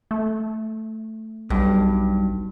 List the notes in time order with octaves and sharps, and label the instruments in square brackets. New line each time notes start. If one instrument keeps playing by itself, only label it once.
[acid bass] A3
[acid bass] B1 [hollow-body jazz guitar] G2